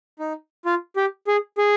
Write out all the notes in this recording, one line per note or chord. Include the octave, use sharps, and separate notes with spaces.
D#4
F4
G4
G#4
G#4